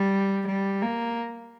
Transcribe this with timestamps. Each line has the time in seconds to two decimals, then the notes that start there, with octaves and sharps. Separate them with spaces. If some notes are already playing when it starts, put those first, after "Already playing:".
Already playing: G3
0.47 G3
0.82 A#3